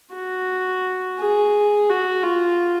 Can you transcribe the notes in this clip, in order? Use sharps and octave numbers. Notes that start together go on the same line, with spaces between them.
F#4
G#4
F#4
F4